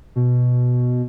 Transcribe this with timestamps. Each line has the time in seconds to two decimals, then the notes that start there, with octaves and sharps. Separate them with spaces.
0.16 B2